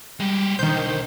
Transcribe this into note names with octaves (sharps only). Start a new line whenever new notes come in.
G3 G#3 G4
B1 D3 D#3 C5 G6